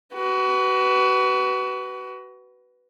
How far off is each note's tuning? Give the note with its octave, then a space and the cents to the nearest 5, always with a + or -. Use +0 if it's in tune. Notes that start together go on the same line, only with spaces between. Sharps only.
F#4 +30 B4 +0